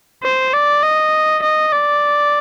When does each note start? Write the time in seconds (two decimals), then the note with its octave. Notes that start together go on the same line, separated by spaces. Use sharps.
0.23 C5
0.53 D5
0.83 D#5
1.43 D#5
1.72 D5